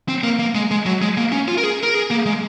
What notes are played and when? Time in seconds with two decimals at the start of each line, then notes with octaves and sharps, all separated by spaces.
0.09 C4
0.24 A#3
0.39 A#3
0.55 G#3
0.71 G#3
0.86 F#3
1.02 G#3
1.17 A#3
1.32 C#4
1.48 F4
1.58 A#4
1.63 G#4
1.83 A#4
1.95 G#4
2.11 A#3
2.26 G#3